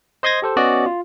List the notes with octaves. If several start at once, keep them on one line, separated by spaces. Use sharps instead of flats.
C5 D#5 C6 D#6 G#6 A#6
G4 A4 C5
B3 C#4 F#4 D5 D#5
F4